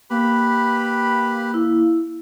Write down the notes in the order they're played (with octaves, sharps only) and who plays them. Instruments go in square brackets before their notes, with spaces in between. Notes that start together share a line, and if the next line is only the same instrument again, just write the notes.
[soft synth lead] A#3 [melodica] G4 B4 B5
[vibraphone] E4